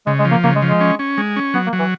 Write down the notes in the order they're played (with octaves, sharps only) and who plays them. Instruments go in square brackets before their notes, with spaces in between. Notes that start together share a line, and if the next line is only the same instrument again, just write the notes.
[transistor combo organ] C#3 [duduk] G#3
[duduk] G#3
[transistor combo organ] F3
[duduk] A#3
[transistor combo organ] C#3 [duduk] A#3
[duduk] G#3
[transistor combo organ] F3
[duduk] G#3
[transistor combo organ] C#4
C#4
G#3
C#4
[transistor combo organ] F#3 [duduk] B3
[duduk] A#3
[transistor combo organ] F#3
[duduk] E3